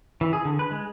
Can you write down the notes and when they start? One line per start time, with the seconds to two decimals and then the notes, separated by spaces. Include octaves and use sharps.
0.21 E3
0.33 G#4
0.45 D3
0.59 B4
0.71 G#3